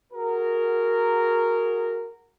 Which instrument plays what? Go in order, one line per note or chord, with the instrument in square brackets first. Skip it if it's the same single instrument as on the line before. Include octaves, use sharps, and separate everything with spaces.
[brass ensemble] F#4 G#4 A#4